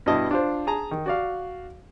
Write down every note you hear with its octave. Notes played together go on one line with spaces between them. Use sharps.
G2 B2 E4 D#5 A5
D4 F4 C5
G#4 A5 A#5
D#3
F#4 D5 F5